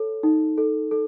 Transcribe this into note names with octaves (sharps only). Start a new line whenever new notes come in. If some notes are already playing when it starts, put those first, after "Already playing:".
Already playing: A4 C#5
D#4
A4
A4